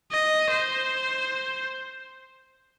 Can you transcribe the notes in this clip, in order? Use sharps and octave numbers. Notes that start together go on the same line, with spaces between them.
D#5
C5